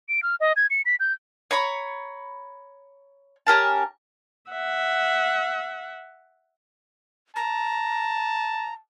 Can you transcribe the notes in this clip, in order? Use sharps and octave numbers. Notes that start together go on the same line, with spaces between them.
D7
F6
D#5
G#6
C#7
B6
G6
C#5 A#5 B5 C#6
C#4 G4 A#4 A5
E5 F#5
A5 A#5